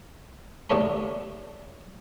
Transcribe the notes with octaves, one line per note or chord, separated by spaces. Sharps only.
D#2 A2 D4 C#5 A#5 B5